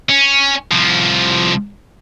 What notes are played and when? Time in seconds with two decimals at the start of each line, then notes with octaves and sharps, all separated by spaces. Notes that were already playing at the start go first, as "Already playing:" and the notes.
0.09 C#4
0.71 C2 F3